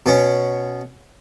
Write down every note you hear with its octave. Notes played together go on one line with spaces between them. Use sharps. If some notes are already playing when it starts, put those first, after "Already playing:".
B2 B3 C#4